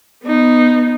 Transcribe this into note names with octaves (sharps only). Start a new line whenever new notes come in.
B3 D#4